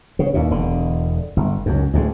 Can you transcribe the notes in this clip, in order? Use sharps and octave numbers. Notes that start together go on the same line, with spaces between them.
C#3
D#2 A#2
E1 D3
G1
C#2 F#2
D2 A2 D3 G#3